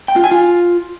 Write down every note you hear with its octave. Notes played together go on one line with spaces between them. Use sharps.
G5
F4
G#5
F4